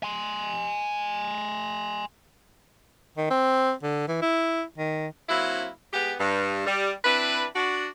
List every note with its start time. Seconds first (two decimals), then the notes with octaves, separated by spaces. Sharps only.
0.03 G#5 C6
3.17 D#3
3.31 C4
3.83 D3
4.08 E3
4.22 E4
4.78 D#3
5.29 F#3 A#3 C4 E4
5.93 G#3 B3 G4
6.19 G2
6.66 G3
7.04 C4 D4 E4 B4
7.55 D4 F#4